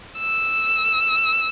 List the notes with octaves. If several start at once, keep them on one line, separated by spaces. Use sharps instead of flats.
E6